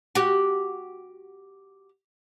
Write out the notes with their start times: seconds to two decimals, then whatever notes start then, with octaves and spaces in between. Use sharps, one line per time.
0.15 F#4 G4